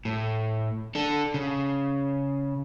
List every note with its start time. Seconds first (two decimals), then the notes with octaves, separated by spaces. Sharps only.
0.05 A2
0.95 D4 A4
1.34 C#3